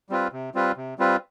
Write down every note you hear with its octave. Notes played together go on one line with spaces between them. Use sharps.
G3 C4 F4 B4
C3
G3 C4 F4 B4
C3
G3 C4 F4 B4